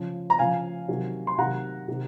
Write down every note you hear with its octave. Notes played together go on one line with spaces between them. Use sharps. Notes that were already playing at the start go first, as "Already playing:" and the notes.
Already playing: C#3 F3
A#5
C#3 F3 F5 G#5
C3 D#3 F#3
C6
C3 D#3 F#3 F#5 A#5
C3 D#3